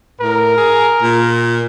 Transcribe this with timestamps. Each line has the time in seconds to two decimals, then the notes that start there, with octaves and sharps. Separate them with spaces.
0.20 A2 A#4
0.57 G#4
1.02 A#2